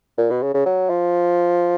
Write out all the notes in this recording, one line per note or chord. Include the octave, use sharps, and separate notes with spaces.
A#2
B2
C#3
C#3
F#3
F3